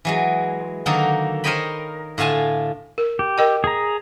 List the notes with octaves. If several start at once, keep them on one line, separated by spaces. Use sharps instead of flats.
E3 F#3 G#3
D3 D#3 F#3 A#3 D#4 A4
A#4 C5 C#5 D#5 G5 B5
A2 D3 F4 G#5 A5
A#4
G4
A#4 D#5 G5
G#4 A#5